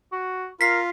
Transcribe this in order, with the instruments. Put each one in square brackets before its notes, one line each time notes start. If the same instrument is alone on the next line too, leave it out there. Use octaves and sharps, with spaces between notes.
[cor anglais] F#4
[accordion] F4 [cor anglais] A#4 [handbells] B6 C7